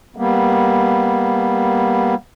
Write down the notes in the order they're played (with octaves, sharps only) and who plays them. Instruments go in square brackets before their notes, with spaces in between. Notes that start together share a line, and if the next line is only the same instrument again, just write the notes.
[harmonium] G3 A#3 B3